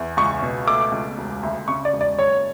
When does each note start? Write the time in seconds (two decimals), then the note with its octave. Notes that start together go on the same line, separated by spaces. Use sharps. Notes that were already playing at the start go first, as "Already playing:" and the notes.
Already playing: E2
0.17 C#2 C#6
0.42 B2
0.67 A3 D6
0.92 C#2
1.18 E1
1.43 D2
1.68 C#3 C#6
1.85 D5
1.93 E1
2.01 D5
2.19 F#1 C#5